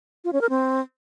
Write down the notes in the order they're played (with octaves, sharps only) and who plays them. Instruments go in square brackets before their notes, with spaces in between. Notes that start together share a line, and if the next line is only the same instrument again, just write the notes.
[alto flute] F4
C#4
A#4
C4